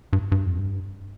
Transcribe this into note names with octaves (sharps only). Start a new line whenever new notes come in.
G2
G2
F2
G2